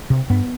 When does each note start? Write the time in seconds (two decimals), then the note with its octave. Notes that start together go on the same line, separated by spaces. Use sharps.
0.10 C3
0.30 G2 B3